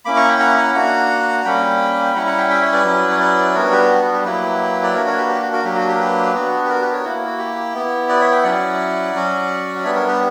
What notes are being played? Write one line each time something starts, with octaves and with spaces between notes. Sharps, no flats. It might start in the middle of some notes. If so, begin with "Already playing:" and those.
A#3 C#4 E4 B5 D6
A#5 C#6
G5 B5
F#5 A#5
F#5 A#5
A#3 D4 F#4 F#5 A#5
G3 A#3 C#4 G5 B5
G5
G3 C#4 E4 F#5 A#5
F#5 A#5
E5 G5
E5 G5
C#5 E5
B4 D5
F#3 C#4 E4
C#5
B4 D5
B4
G3 B3 D4 F#4 A#4 C#5
G4 B4
F#4
G4
F#3 A#3 E4 G4 B4
D5
A#3 D4 F#4 A#4 C#5
A#4 C#5
G4 B4
G4
F#4
F#4 A#4
F#3 A#3 D4 G4
F#4
G4
A#4
G4 B4
B3 D4 F#4
G4
F#4 A#4
G4 B4
A#4 C#5
A#3 E4 F#4
F#4
G4
B3 E4
B4 D5
C#5 E5
E5 G5
F#3 C#4 E4 D5 F#5
F#3 C#4 F#4
F#5
G3 B3 D4 C#5 E5
A#4 C#5
G4 B4